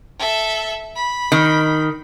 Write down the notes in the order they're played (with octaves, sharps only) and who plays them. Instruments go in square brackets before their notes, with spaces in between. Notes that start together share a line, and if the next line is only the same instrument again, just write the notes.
[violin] A4 E5
B5
[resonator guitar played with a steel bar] D#3